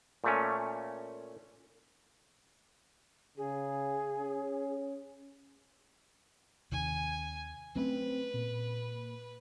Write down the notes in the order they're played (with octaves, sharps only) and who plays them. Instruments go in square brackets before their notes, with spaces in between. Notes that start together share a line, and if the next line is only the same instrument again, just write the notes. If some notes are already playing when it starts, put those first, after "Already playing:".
[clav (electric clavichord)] A#2 A3 C#4
[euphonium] C#3 [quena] G#4
[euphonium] C#4
[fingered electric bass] D#2 C3 D#3 [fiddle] G#5
[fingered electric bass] F#3 A3 C#4 [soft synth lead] C4 [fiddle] B4
[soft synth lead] A#2